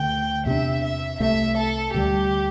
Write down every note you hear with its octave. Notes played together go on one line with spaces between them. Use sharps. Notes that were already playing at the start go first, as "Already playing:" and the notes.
Already playing: D2 D3 A3 G5
E2 C3 A3 D4 E5
E5
C2 C3 A3 E5
A4
D2 D3 G3 G4